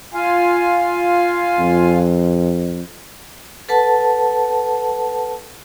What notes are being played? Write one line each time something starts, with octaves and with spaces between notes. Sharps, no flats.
F4 F5 G#5
F2
A4 B4 F#5 A5